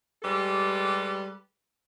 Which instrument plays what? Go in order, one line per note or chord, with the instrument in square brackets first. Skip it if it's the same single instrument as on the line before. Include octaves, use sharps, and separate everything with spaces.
[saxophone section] G3 G#3 G4 A4 B4